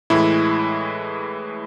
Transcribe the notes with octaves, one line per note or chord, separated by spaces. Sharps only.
A2 E3 G#3 E4